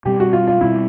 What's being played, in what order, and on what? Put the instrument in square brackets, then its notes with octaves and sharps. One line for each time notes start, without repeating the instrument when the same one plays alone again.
[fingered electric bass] B2 G3 C4 [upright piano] G4
[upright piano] F#4
F4
F4
[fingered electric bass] B2 G3 C4 [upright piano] E4